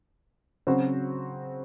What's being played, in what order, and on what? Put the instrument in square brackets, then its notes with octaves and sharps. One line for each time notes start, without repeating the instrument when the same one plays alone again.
[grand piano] C#3 F#3 C4 F#4 C5